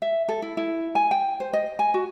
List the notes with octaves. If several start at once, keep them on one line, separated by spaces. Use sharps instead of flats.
E5
A4
E4
E4
G#5
G5
C5
D#5
G#5
F#4